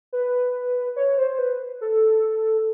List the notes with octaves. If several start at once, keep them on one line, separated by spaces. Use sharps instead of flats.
B4
C#5
C5
B4
A4